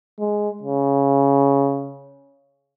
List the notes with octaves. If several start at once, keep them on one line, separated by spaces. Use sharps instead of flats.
G#3
C#3